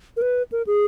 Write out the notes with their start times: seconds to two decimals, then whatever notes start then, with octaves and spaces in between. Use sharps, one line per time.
0.17 A#4
0.22 B4
0.52 A#4
0.67 G#4